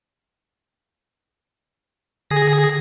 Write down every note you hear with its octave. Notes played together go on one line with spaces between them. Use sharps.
D3 G#4 A#6